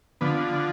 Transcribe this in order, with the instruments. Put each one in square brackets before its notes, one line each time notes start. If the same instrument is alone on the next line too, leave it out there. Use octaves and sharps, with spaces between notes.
[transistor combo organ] D3 F3 B3